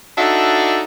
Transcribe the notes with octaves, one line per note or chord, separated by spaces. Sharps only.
D4 D#4 F#4 A4 D5 E5